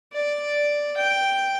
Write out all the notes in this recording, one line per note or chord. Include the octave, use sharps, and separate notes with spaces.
D5
G5